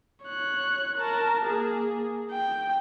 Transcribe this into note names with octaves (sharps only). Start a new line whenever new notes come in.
C#5 F#6
A#4 A5
A#3 G#4
G5